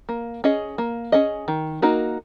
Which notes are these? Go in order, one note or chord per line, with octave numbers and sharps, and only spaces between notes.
A#3
C#4 G#4 D#5
A#3
C#4 G#4 D#5
D#3
A#3 D#4 F#4 A#4